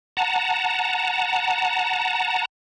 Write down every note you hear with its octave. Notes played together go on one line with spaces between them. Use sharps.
F#5 A5 A#5